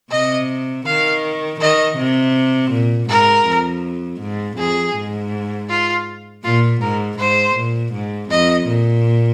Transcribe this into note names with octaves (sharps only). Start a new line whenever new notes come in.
C3 D#5
D#3 F5
D#3 D#5
C3
A#2
G#2 A#4
F2
G#2
F2 G#4
G#2
F4
A#2 F4
G#2 A#4
G#2 C5
A#2
G#2
F2 D#5
A#2